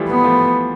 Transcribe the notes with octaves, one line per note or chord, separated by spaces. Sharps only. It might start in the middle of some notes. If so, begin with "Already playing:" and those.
Already playing: E3 F3 G3 A3
B3
F3 A3